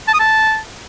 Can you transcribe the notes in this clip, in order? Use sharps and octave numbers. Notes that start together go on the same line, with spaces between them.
A5
D#6
A5